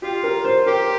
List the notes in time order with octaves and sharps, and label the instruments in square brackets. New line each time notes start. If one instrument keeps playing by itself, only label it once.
[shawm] F4 [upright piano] G4
[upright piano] A#4
C5
[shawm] G4 [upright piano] A#4